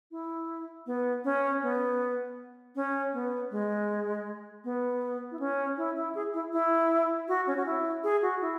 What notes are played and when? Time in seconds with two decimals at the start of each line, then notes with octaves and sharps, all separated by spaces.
0.11 E4
0.86 B3
1.24 C#4
1.62 B3
2.75 C#4
3.13 B3
3.51 G#3
4.64 B3
5.31 E4
5.39 C#4
5.77 E4
5.96 E4
6.15 G#4
6.34 E4
6.53 E4
7.28 F#4
7.47 C#4
7.57 F#4
7.66 E4
8.04 G#4
8.22 F#4
8.41 E4